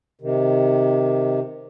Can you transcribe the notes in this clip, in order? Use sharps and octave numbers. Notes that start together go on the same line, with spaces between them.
C3 D#3